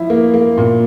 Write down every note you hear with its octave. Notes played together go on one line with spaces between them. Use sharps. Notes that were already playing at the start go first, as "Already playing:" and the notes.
Already playing: F3 E4
A#3
A#3
A#2